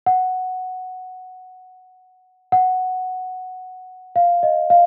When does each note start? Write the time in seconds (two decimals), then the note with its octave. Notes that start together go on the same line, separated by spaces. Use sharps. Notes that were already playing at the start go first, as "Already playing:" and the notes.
0.06 F#5
2.52 F#5
4.16 F5
4.43 D#5
4.70 F5